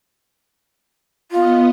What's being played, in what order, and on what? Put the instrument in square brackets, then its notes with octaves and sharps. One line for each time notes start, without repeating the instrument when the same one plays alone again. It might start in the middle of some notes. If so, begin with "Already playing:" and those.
[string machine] B3 D#5 [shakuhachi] F4